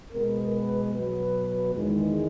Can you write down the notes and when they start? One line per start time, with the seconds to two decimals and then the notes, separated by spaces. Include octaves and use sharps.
0.12 B2 G#3 B3 A#4
0.53 B4
0.93 B2 F#3 B3 B4
1.74 E2 D#3 G#3